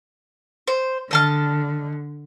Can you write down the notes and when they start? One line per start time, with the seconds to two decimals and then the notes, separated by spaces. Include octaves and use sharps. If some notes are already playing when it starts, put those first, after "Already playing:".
0.68 C5
1.11 D3 D#5 A5 F6